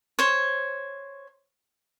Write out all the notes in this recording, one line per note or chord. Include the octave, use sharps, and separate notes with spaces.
C5 C#5